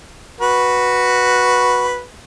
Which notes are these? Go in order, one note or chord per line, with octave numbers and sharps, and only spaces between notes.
F#4 B4